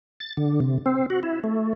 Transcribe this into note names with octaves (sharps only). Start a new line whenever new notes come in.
A6
D3
C3
C4
F#4
E4
A3